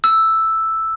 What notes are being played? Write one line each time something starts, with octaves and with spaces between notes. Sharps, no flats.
E6